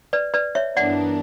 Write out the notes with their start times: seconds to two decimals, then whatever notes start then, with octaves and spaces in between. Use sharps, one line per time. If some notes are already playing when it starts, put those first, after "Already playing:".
0.13 B4 D5
0.34 B4 D5
0.55 C#5 E5
0.77 G2 E3 B3 D4 A#4 D5 F#5